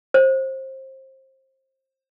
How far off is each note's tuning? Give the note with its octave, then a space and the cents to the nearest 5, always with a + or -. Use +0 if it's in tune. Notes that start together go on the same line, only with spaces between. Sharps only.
C5 +25